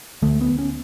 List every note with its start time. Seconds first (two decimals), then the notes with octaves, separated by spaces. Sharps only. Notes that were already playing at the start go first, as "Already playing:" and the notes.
0.22 D2 D3 A3
0.41 B3
0.59 C#4